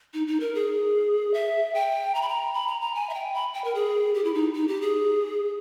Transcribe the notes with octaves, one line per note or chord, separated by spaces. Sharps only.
D#4
D#4
A#4
G#4
E5
G5
A#5
B5
A#5
B5
A#5
A#5
G#5
E5
G5
B5
G5
A#4
G#4
G4
E4
D#4
D#4
G4
G#4